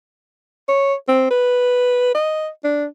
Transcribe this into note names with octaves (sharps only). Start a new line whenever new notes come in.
C#5
C4
B4
D#5
D4